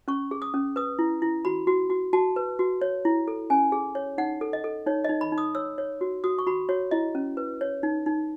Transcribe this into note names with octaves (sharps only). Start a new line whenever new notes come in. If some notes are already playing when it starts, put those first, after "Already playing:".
C#4 C#6
G#4
D#6
C#4
B4 D#6
E4
E4
F#4 B5
F#4
F#4
F#4 A5
B4
F#4
C#5
E4
A4
C#4 G#5
G#4
C#5
D#4 F#5
A4
D#5
A4
D#4 C#5
D#4 D#5
B5
D#4
D#6
C#5 E6
C#5
F#4
F#4 D#6
C#6
F#4 B5
F#4 C#5
E4 D#5
C#4
B4
C#5
D#4
D#4